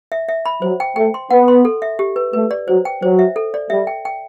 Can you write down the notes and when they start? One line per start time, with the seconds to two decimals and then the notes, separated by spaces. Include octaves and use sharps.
0.12 E5
0.29 E5
0.46 B5
0.62 F#3 C5
0.80 G5
0.96 A3 G5
1.14 C6
1.30 B3 F#5
1.48 C6
1.65 A4
1.82 E5
1.99 G4
2.16 B4
2.33 A3 B4
2.51 D5
2.68 F#3 C5
2.85 G5
3.03 F#3 C5
3.19 E5
3.36 A4
3.54 D5
3.70 G3 E5
3.87 G5
4.05 G5